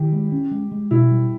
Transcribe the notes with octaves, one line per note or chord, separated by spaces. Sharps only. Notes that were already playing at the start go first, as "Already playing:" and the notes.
Already playing: D#3 E4 G4
G#3
C#4
G#3
G#3
B2 E4
G3